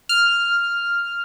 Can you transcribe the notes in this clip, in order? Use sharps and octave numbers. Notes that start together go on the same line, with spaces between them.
F6